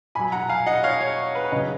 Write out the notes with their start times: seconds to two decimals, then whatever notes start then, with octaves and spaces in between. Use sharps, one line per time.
0.15 B2 F#3 G#5 B5
0.32 F#5 A#5
0.49 F5 G#5
0.66 D#5 F#5
0.83 C#5 F5
1.01 C#5
1.35 B4
1.52 C#3 B4 D#5
1.55 F#3